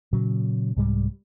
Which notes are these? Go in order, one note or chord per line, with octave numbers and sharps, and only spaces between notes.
A#2 C#3 F#3
C2 G#2 G3